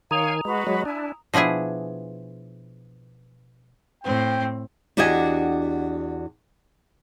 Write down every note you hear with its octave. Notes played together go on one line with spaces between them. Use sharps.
D#3 C#5 F5 G#5 A#5 D#6 F7
G#3 F#4 B4
F#3 G#3
D4 E4 G#5
B2 F3 D4 E4 G#4
A2 C4 G5
E2 D4 F#4 G4 D#5 G#5